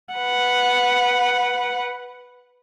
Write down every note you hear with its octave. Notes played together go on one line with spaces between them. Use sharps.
B4 F#5